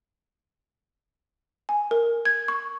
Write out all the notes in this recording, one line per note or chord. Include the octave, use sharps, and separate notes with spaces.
G#5
A#4
G#6
C#6